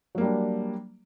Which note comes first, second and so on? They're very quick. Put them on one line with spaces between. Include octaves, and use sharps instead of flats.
F#3 A#3 G3 D4